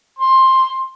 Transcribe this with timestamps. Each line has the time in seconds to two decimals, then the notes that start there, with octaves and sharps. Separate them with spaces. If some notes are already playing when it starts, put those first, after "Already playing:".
0.19 C6